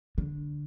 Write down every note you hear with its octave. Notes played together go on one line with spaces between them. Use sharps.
D3